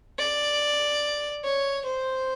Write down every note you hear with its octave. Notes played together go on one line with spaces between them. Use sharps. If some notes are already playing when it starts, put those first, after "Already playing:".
D5
C#5
C5